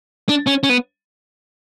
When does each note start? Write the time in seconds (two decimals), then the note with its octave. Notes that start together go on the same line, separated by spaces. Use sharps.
0.29 D4
0.47 C#4
0.63 C#4
0.69 B3